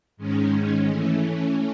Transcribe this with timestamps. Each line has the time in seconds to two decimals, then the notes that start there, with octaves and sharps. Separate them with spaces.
0.17 G#2 D#3 G#3 C#4
0.88 E3 A3 C#4